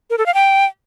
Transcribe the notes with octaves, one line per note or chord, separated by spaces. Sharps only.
A#4
A4
F5
G5